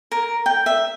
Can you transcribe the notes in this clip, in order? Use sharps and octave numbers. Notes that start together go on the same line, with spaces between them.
A#4
G5
E5